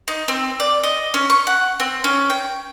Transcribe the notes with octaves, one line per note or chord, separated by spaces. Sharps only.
D#4
C4
D5
D#5
C#4
C#6
F#5
C4
C#4
G5